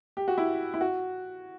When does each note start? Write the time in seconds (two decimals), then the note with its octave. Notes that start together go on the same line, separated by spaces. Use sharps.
0.17 G4
0.28 F#4
0.38 E4
0.74 E4
0.81 F#4